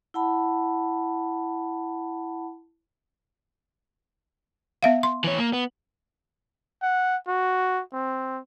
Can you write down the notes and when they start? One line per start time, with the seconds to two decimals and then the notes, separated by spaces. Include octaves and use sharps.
0.14 E4 F#5 A5 B5
4.83 B3 E5 F5
5.03 C6
5.24 E3 C#5
5.38 A#3
5.53 B3
6.82 F#5
7.28 F#4
7.93 C4